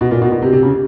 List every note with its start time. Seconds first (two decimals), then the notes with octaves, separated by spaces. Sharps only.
0.01 B2
0.11 A#2
0.22 B2
0.32 B2
0.42 C3
0.53 C3
0.63 C#3